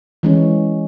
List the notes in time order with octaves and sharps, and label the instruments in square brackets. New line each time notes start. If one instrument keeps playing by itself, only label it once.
[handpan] E3 G#3 C#4